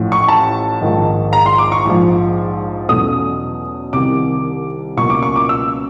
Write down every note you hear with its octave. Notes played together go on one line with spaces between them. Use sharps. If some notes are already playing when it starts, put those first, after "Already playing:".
Already playing: A1 A2 F3
C#6
A5
A#1 G#2 D#3
A#5
C6
D6
C#6
A#1 G#2 F3
E2 B2 F#3 A3 C#4 D#6
C2 C3 D#3 D6
C#2 B2 F#3 A#3 C#4 C#6
D6
C#6
D6
E6